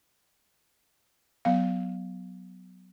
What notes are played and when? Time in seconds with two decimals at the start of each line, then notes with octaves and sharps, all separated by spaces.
1.45 F#3 B3 F5